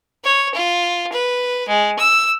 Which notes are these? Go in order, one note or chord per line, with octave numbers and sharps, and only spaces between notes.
C#5
F4
B4
G#3
E6